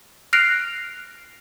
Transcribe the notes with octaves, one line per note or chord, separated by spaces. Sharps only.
F6 F#6 A#6 C7 D7 F7